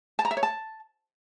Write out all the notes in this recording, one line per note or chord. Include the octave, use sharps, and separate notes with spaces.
A5
A#5
E5
C#5
A5